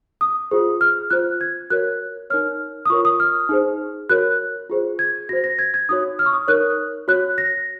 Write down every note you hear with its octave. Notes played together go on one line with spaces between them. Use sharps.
D#6
F4 G#4 C5
F6
F4 C5 F#6
G#6
F#4 A#4 C#5 F#6
D#4 A#4 C#5 F6
D#6
F4 A#4 C#5 C#6
D#6
F6
D#4 G#4 C5
F#4 A#4 C#5 F#6
F4 G#4 C5
G#6
F#4 C5 A#6
A#6
G#6
G#6
D#4 F#4 C#5 D#6
F6
C#6
D#6
D#4 A#4 C#5 F#6
F#4 C#5 F#6
A#6